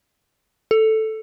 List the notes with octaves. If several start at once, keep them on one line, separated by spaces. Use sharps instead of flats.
A4